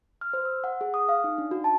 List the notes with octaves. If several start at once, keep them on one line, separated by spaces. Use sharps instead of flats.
F6
C5
E6
F#5
G#4
D#6
F5
D#4
D4
F#4
A5